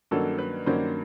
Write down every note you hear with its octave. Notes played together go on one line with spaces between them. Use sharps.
G2 D#3 F#3 A#3 C#4 A4
B4
G2 D#3 F#3 A#3 C#4 C5